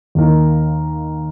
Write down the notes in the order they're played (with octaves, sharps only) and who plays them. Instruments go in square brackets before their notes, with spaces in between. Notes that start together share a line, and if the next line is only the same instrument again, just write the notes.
[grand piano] D#2 D#3 A#3 D#4 A#4